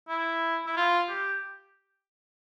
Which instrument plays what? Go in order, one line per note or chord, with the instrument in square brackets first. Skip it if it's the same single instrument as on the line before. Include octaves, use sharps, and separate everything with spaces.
[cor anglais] E4
E4
F4
G4